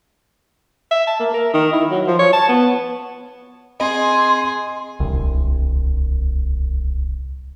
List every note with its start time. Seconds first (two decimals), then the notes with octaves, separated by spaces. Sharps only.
0.91 E5
1.07 A5
1.19 A#3
1.34 A#4
1.53 D#3
1.73 E4
1.90 F#3
2.07 F3
2.19 C#5
2.33 A5
2.49 B3
3.80 C4 G#4 D#5 C6
5.00 D1 C2